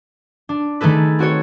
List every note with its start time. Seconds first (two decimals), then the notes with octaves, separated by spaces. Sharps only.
0.49 D4
0.81 D#3 A3 G#4 A4 B4
1.19 C4 F#4 A4 C#5